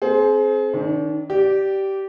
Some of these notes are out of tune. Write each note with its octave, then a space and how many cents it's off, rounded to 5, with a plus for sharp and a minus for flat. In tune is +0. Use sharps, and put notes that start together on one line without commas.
C4 +0 G#4 +35 C5 +0
D#3 +0 D4 -40
G4 -15 D5 +0